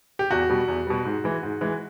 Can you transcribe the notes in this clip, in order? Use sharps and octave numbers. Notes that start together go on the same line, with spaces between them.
G4
E2 F#4
B2 G3
E2
B2 G3
G#2
E3 G#3
G#2
E3 G#3